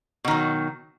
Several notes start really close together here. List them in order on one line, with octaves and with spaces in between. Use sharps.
B2 D#3 F#3